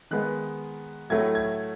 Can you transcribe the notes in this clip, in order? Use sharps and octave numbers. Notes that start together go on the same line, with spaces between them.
D#3 G#3 B3 F#6
A2 F#3 A3 G#6
G#6